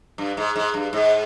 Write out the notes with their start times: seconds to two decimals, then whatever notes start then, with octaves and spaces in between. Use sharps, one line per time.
0.18 G2
0.37 G#2
0.56 G#2
0.74 G2
0.93 G#2